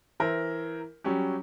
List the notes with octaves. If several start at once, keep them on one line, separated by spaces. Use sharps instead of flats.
E3 A#4 C5 E5
F#3 G3 C#4 G4